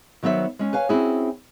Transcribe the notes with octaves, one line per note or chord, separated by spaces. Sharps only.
D#3 F#3 B3 C5 E5
G#3 C#4
B4 C#5 F5 G#5
C4 C#4 E4 F#4 G#4